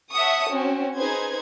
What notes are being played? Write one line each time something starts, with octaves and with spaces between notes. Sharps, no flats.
C#5 E5 F#5 A5 C#6 D#6
C4 C#4 F#4
D#4 G#4 B4 C5 G#6